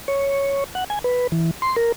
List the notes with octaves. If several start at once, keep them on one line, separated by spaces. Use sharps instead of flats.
C#5
F#5
G#5
B4
E3
C6
A#4